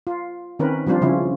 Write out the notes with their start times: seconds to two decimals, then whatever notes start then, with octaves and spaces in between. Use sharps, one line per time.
0.07 F4
0.59 D#3 C4 C#4 A#4 B4
0.87 F3 G3 C4 D4 F4
1.02 C#3 F3 C#4 E4